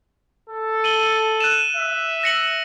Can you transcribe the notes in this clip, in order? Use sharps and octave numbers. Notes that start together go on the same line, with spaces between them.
A4
D#7 F#7 G7
F#6 D#7 E7
E5
A#6 C#7 F#7